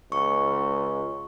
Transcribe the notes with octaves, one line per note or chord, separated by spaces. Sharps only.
C#2 C#6